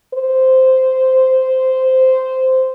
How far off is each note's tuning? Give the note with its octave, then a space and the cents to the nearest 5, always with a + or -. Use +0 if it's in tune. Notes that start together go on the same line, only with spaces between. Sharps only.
C5 -10